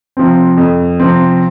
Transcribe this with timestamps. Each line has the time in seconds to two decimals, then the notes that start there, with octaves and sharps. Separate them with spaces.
0.17 C3 F3 C4
0.58 F2
1.00 C3 F3 C4